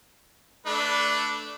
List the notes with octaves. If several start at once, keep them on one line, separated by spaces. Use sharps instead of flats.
A3 D4 B4